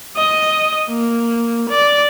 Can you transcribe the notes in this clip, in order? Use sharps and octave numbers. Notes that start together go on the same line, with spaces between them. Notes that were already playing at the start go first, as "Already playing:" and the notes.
D#5
A#3
D5